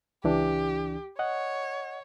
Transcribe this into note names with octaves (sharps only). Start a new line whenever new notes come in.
C#2 E3 D4 G4
C#5 D#5 F#5